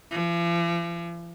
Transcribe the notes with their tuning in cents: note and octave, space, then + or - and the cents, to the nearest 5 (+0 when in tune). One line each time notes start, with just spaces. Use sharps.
F3 -45